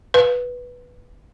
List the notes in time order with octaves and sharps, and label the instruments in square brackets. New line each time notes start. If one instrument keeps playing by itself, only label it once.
[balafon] B4